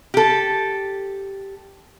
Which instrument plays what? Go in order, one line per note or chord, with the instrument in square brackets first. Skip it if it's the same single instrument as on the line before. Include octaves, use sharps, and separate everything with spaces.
[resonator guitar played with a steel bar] G4 A4